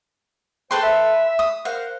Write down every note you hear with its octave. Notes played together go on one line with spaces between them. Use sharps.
A4 B4 C5 G5 C6
E5
D#6
A#4 C5 F5 F#5